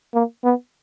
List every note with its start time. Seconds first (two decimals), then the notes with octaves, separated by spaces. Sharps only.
0.14 A#3
0.44 B3